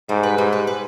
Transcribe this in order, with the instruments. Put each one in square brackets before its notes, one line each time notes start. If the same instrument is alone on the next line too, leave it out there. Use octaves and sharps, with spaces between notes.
[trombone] G#2 [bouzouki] G3
[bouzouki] B4
[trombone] G#2 [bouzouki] G3
[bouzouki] B4
B4